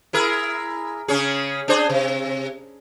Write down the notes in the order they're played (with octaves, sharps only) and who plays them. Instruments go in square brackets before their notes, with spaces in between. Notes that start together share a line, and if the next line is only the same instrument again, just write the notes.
[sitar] E4 G#4 A#4
C#3 C#4 G#4
D4 G#4 C5
C3